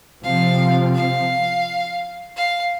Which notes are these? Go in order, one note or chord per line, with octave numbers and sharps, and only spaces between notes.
C3 F3 C4 F5
F5
F5